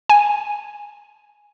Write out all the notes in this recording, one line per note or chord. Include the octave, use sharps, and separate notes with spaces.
G#5